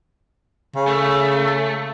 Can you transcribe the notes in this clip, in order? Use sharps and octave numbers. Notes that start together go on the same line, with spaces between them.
C#3
A3